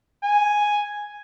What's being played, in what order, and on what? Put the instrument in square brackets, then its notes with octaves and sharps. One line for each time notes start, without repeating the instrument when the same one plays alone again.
[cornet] G#5